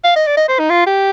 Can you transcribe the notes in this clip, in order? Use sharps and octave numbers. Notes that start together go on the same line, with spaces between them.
F5
D#5
D5
D#5
C5
D#4
F4
G4